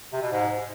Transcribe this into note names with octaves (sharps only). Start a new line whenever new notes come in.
C3
B2
G#2